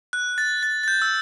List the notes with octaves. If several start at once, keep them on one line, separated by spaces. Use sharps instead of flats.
F#6
A6
A6
A6
G6
E6